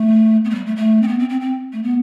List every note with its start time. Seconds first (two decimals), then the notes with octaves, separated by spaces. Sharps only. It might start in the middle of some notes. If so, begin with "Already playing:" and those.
Already playing: A3
0.45 B3
0.50 A3
0.55 G3
0.66 A3
0.76 A3
1.02 C4
1.08 B3
1.19 C4
1.29 C4
1.41 C4
1.73 A3
1.83 B3